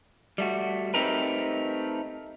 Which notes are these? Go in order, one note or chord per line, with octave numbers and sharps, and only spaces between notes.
G3 A3 F#4
A3 C4 D#4 G4 A#4 B4